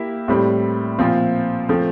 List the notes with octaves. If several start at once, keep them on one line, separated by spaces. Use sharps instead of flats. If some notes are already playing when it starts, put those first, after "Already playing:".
Already playing: A#3 E4 G4 E5
A2 G3 C4
A#2 F3 C4 F4
F3 A3 C4